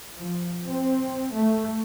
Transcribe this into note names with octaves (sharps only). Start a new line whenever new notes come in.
F3
C4
A3